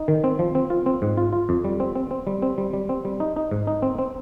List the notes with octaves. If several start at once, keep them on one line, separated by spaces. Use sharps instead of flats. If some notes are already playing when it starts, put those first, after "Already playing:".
Already playing: D#4
D#3
C4
F3
C4
F4
C4
G#2
F4
F4
F2
G3
C4
C4
C4
G3
C4
G3
G3
C4
G3
D#4
D#4
G#2
D#4
C4
C4